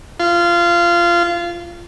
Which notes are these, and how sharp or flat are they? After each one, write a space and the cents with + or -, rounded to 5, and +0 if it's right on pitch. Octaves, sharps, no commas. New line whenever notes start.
F4 -20